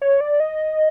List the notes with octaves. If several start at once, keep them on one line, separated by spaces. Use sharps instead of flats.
C#5
D5
D#5